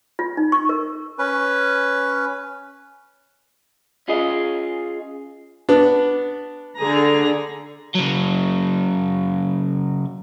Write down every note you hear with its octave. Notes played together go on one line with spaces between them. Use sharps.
F4
D#4
C#6
A#4
C#4 B4
C#4 F4 G#4 D#5
B3 D4
D3 G#4 A#5
C#3 F#3